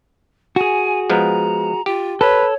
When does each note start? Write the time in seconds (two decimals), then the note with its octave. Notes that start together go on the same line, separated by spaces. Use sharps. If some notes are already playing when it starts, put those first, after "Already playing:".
0.56 F#4 G#4 G#5
1.10 F3 G#3 B3 A#5
1.86 F4 G4
2.21 A4 B4 C#5